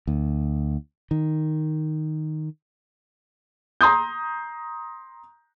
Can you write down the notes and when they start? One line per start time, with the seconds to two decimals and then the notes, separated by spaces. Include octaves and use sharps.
0.07 D2
1.11 D#3
3.81 A#5 C6 D#6 G6